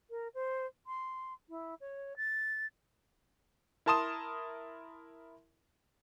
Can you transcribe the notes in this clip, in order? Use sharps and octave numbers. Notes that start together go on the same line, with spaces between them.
A#4
C5
C6
E4
C#5
A6
E4 A#4 A5 C6 D#6 E7